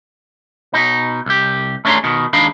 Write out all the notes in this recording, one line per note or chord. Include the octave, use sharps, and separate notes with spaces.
B2 D#4
C2 G4
A3 C#4 D4 G#4 A#5 C6
B2 D#3
D#2 G#3 D4 D#4 F5 B5